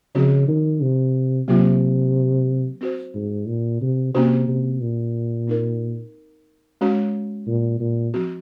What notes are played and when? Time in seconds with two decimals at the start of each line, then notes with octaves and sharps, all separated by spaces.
0.15 C#3 F3 C4 F#4 C#5
0.48 D#3
0.81 C3
1.48 C3 F#3 A#3 F4
2.81 C4 F#4 C5
3.14 G#2
3.47 A#2
3.81 C3
4.14 C3 A#3 C#4 F#4 C5
4.48 C3
4.81 A#2
5.47 C4 D#4 A#4
6.81 G#3 C#4 F#4 C#5
7.47 A#2
7.80 A#2
8.14 F3 C4 F#4